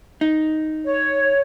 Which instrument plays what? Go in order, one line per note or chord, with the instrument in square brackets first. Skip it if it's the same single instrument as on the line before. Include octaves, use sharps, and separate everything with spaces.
[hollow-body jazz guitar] D#4
[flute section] C#5